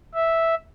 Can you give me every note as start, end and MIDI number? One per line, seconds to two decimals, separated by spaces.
0.14 0.55 76